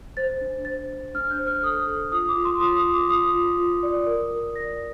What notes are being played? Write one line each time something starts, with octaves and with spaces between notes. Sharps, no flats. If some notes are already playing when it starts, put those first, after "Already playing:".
C5 A6
D4
C5 A6
C5
D4 F6
G6
C5
F6
A4 D#6
A4
F4 D#6
D6
F4
C6
F4 D#6
D#6
F4
D6
F4 D#6
F4
F4
D5
A#4
A#4
D5 A#6